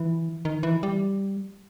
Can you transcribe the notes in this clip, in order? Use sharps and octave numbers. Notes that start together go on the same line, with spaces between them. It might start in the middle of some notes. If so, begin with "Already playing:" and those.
Already playing: E3
D#3
E3
G3